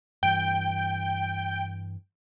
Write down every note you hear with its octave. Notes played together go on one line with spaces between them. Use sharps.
G2 E3 G5